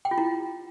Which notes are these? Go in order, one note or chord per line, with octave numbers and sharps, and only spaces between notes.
G5
F4
E4